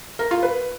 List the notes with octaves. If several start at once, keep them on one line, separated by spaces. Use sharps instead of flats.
A#4
F4
B4